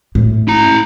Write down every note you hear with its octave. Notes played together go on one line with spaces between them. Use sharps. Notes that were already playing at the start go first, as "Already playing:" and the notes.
A2
E4 A#5